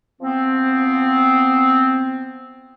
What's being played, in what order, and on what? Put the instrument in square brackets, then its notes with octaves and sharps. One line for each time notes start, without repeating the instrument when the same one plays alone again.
[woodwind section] F3 B3 C4